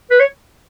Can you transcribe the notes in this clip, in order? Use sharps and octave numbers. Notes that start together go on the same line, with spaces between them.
B4
C#5